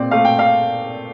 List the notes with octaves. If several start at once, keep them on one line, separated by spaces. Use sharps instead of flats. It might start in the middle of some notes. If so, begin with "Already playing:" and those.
Already playing: A#2 C4 D5
A3 F5
G5
F5